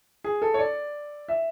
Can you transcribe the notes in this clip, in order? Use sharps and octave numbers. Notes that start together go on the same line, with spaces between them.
G#4
A4
C#5
D5
E5